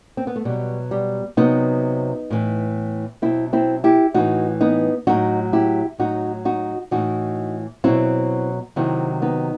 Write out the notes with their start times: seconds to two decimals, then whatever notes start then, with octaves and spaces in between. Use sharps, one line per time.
0.17 C4
0.27 B3
0.36 A3
0.45 B2 F#3 G3
0.91 G3
1.37 C3 F#3 B3 D#4
2.30 A2 E3
3.22 B2 F#3 C4 E4
3.53 C4 E4
3.84 E4 G4
4.14 A2 E3 D#4 F#4
4.61 B3 D#4
5.07 A2 F#3 D#4 F#4
5.53 E4 G4
5.99 A2 F#3 D#4 F#4
6.45 D#4 F#4
6.91 A2 E3 D#4 F#4
7.84 B2 F#3 C4 E4
8.76 C3 D#3 F#3 C4 E4
9.22 B3 D#4